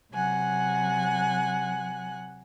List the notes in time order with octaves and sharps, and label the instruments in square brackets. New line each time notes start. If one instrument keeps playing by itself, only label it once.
[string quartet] C3 F#3 F#5 G#5 F#6